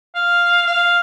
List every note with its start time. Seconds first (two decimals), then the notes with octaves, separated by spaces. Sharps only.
0.15 F5
0.67 F5